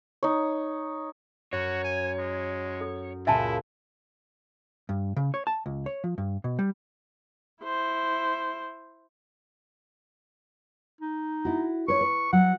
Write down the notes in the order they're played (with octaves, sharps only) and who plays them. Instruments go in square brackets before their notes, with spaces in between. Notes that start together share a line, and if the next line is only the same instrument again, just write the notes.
[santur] D#4 C#5
[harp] F#2 [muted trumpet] F#4 [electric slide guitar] C#5
[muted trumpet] G#5
G#3
[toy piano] A4
[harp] C#2 A#2 [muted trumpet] E4 [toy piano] E5 G#5 A5
[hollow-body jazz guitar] G2
C#3
C#5
A5
C#2
C#5
F3
G2
B2
G3
[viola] E4 C5
[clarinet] D#4
[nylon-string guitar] E4 F#4
[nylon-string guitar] B4 C#5 [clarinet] C#6
[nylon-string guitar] B4
[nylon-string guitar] F#3 [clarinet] F#5